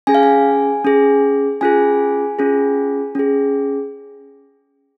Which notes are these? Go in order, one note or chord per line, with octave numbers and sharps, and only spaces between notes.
C#4 G#4 G#5
F5
G#5
C#4 G#4
C#4 F4 G#4 G#5
C#4 F4 G#4
C#4 G#4